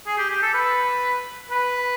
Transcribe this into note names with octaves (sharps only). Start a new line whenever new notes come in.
G#4
G4
G4
A4
B4
B4